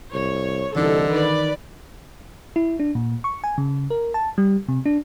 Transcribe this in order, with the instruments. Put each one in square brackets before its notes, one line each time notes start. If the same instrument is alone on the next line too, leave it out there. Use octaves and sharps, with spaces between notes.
[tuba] C2 [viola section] C#5
[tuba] C2 [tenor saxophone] D3 [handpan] E3 D#4 [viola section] A4
[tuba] D#3 [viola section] B4 D5
[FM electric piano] E4
D4
A#2
C#6
G#5
C#3
A#4
A5
G3
C3
D4